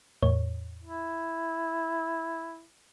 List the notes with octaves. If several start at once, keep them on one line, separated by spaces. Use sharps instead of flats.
E2 A2 C#5
E4